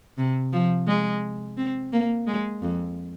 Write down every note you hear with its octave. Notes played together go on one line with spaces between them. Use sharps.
C3
F3
G#3
C4
A#3
G#3
F2